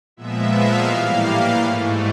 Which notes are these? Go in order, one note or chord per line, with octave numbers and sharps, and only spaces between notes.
A#2 F3 G#3 B3 E5
F5
A2 E3 G3 A#3 F5
G#2 E3 A3